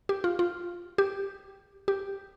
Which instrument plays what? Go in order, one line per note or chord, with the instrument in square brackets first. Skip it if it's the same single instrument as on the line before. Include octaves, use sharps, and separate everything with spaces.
[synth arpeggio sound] G4
F4
F4
G4
G4